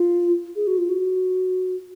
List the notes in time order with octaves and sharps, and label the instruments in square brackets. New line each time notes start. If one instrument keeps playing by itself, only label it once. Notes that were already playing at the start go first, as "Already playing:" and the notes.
Already playing: [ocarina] F4
G#4
F#4
F4
F#4